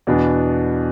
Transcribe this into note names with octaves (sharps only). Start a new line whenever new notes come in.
E2 B2 B3 D4